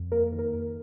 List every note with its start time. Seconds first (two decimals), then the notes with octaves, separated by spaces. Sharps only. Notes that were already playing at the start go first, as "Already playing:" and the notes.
Already playing: F2
0.12 A#3 A#4
0.32 D#3
0.39 A#4
0.53 F2